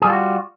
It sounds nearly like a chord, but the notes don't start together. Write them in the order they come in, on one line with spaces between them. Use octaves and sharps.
G#4 G3 F4 A4 F#4